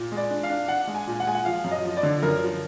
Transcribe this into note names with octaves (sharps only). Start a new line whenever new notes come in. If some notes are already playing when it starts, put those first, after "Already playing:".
Already playing: A#2
G#3
D5
D4
F5
D4
D4 F#5
G#3
G#5
A#2
F#5
G#3 G#5
F#5
F3 F5
F#2
D#5
F3
D5
D3
F#2 A#4
F3